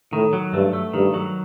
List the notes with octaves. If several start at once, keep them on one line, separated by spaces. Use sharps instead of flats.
A2 D#3
F#3
G2 A3
A3
G2 D#3
F#3